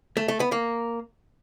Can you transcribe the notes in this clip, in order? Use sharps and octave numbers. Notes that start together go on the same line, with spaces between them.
A3
A3
B3
A#3